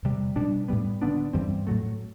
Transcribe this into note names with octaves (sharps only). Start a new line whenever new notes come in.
E2 C3 G3
B2 G3 D4
A2 G3 B3
D3 F#3 B3 D4
G2 E3 G3 C4
A2 F#3 A3